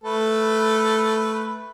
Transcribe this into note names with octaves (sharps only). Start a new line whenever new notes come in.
A3 A4 B4